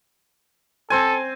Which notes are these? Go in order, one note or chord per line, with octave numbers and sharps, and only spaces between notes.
C4 A4 C5 G#5